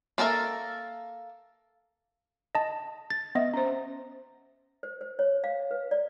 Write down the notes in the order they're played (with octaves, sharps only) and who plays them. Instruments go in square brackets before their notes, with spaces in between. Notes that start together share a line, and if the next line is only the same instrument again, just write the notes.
[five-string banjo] A#3 A4 A#4 E5
[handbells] D#5 A5
A6
[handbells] B3 D#5 [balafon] E5
[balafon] C#4 C5
[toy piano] C5
C5
C#5
F5
B4
D5